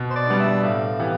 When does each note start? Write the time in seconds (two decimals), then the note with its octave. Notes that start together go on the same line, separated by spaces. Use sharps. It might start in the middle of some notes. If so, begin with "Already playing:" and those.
Already playing: B2
0.10 C5
0.16 D5
0.27 G3 B3 D4
0.40 E5
0.63 A2 F5
0.99 E3 B3 E4 G4